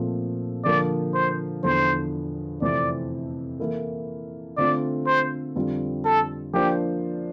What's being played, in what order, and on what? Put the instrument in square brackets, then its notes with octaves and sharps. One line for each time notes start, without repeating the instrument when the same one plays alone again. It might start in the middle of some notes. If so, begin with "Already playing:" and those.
Already playing: [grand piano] A#2 F3 A3 C4
[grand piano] D3 F3 A#3 [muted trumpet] D5
[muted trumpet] C5
[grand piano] E2 D3 F3 [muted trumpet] C5
[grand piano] F2 C3 E3 A3 C4 [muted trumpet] D5
[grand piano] E3 A#3 E4 A4
[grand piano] D3 A3 C4 F4 [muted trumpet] D5
[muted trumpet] C5
[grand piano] F2 D3 G3 C4 F4
[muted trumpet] A4
[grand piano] F3 A#3 D4 F4 C5 [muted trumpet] G4